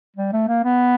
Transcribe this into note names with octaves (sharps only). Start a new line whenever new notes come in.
G3
A3
A#3
B3